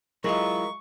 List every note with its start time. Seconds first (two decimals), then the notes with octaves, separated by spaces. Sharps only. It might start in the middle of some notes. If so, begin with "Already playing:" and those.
0.24 F#3 G#3 E4 F4 A#4 D#5 C#6